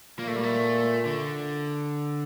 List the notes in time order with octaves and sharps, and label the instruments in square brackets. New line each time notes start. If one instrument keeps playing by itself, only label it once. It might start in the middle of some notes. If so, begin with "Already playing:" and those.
[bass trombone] A#2 [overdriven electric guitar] A#3
[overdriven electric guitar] A3
G3
A3
D3